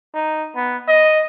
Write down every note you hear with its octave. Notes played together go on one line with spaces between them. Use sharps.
D#4
B3
D#5